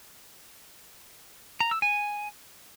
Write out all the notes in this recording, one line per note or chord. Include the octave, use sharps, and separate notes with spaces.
A#5
E6
G#5